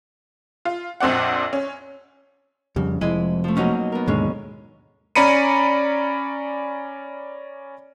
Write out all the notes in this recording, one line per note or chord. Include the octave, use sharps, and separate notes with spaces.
F4
A#1 F2 C4 D5 F#5
C#4
F2 C#3 G3
F1 F2 G#3 E4 D#5
F3 A3
B2 F#3 A#3 C#4 D#4 F#4
B3 A#4
D#2 G#2 B2 D3 G#3 C#4
C#4 D5 A#5 B5 C#7 D#7